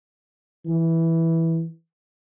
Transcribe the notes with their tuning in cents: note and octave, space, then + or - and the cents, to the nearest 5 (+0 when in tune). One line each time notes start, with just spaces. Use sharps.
E3 -5